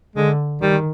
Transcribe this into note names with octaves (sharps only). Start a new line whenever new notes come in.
D3 G#3
D#3 G3